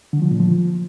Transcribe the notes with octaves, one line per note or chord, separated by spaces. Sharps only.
D3
F3
A#2
F3